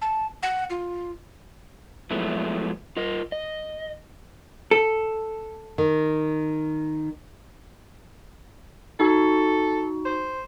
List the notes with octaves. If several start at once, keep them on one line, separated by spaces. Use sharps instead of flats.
A5
F#5
F4
F3 F#3 G#3 A3 B3 E4
F4 A#4 D#5
D#5
A4
D#3
D#4 F#4 A4
C5